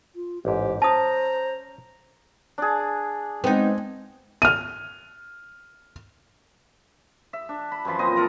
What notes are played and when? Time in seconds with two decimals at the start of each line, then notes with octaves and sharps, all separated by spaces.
0.16 F4
0.45 A1 G#2 G4 C5
0.82 C#4 C5 A5 A#5 D#6
2.58 D4 G#4
3.44 G#3 B3 C4 D#4
4.42 F6 D#7
7.33 E5
7.49 D4
7.72 B5
7.85 F#2 E3 F3 B5
7.99 A#2 C4 D#5
8.15 A4 A#4 A#5 B5